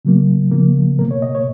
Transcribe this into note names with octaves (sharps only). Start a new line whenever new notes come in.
C#3 F#3 A#3
C#3 F3 A#3
B2 A#3 A#4
C#5
D#5
C#5